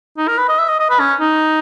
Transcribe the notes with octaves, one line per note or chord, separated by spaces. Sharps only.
D#4
A#4
B4
D#5
E5
D#5
D#5
B4
C#4
D#4